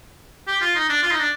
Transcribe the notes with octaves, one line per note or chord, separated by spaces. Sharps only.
G4
F4
D#4
D4
F4
D#4
D4